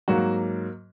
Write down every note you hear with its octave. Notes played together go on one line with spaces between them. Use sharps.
G#2 F#3 A#3 F#4